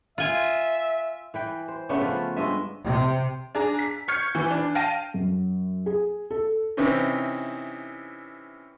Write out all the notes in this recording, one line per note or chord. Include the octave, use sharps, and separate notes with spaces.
F4 E5 G#5
E3 B4 G5
C5
C#3 A3 B3 D4
F3 C#4 F4 B4
G2 G#3 D#5 E5
C3
D4 G#4 A#5
B6
C#6 F6 G6 G#6 C#7
E3 B4
D4
F5 G5 A5 A#6 D#7
F#2
G#4
A4
C3 E3 C4 C#4 D#4